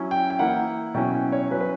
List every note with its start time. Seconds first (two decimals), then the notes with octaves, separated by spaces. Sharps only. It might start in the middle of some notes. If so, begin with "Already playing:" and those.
Already playing: F#3 C#4 E4
0.11 G5
0.30 G5
0.39 E3 A#3 E4 F#5
0.94 B2 F#3 C#4 E4 G5
1.14 G5
1.32 C#5
1.50 F#3 C#4 E4 B4
1.61 B4